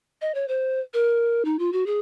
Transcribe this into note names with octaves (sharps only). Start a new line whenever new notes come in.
D#5
C#5
C5
A#4
D#4
F4
F#4
G#4